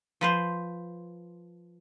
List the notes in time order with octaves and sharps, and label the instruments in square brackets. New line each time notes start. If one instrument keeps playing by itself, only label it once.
[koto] F3 B4 C5